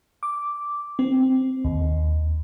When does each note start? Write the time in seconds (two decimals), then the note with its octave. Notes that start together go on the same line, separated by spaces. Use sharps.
0.23 D6
0.99 C4
1.65 D#2